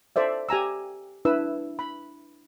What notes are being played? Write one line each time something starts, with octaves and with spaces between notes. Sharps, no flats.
A4 C5 D5 E5
G4 G#5 A#5 E6
D4 E4 B4 E6
B5